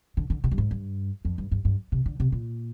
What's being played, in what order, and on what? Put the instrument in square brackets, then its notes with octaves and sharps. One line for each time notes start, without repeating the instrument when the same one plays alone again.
[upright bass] D3
D3
C3
G2
G#2
G2
F2
G2
G2
G2
C3
D3
C3
A#2